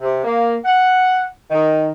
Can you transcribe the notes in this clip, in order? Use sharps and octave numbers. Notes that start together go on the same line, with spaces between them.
C3
A#3
F#5
D#3